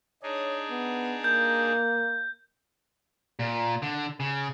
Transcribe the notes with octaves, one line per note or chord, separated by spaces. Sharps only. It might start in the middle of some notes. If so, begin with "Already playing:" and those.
D4 D#4 G#4 C#5
B3
A#3 G6
A#2
D3
C#3